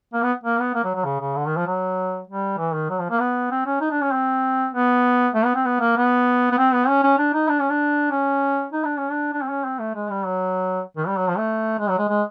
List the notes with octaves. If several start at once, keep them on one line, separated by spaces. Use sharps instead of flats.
A#3
B3
A#3
B3
A#3
F#3
F#3
C#3
C#3
D3
D#3
F3
F#3
G3
E3
D#3
F#3
F3
A#3
B3
C4
C#4
D#4
D4
C#4
C4
B3
A3
B3
C4
B3
A#3
B3
B3
C4
B3
C#4
C#4
D4
D#4
D4
C#4
D4
C#4
D#4
D4
C#4
D4
D4
C4
C#4
C4
A3
G#3
G3
F#3
D#3
G3
F#3
F3
A3
G#3
F#3
G#3
G#3